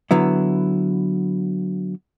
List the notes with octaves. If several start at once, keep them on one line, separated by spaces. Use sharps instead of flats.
D3 F#3 B3 E4